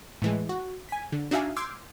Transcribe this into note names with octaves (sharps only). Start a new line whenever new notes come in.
A2 E3 G#3
F#4
G#5 B6
D3
D4 D#4 F#4 E5 F5 G#5
C6 D6 E6 F6 G6 G#6